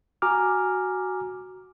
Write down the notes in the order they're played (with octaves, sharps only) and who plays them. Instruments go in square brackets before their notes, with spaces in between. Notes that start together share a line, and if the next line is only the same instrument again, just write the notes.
[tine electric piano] F#4 G#5 A#5 D6 F6